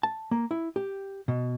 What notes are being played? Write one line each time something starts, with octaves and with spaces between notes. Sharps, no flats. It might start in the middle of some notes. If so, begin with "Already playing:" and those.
A5
A#3
E4
G4
B2